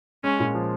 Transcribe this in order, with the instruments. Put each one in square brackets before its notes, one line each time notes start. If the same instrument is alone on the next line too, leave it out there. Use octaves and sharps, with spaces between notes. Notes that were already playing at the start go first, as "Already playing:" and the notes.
[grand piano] G#3 [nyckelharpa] C#4
[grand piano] A#2
F3